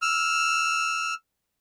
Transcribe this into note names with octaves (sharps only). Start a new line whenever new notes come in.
E6 F6